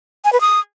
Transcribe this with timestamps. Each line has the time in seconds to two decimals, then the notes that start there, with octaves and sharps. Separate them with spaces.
0.25 G#5
0.33 B4
0.41 D#6